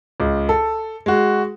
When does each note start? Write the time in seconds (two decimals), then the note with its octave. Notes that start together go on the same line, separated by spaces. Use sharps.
0.20 C#2
0.49 A4
1.06 G#3 F#4